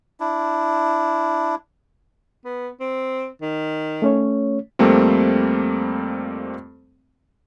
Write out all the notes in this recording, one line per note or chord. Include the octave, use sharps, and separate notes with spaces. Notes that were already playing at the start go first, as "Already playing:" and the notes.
D4 E4
B3
C4
D#3
A3 C#4 C#5
F2 G3 A3 A#3 C4